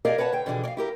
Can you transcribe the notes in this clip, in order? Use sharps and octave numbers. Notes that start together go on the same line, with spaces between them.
G4 G#4 A#4 D5 D#5 F5
B4 C#5 F#5 G5 A5
D3 G5
B2 D3 E3 F3 D4 G#4
D5 F5
E4 G4 A#4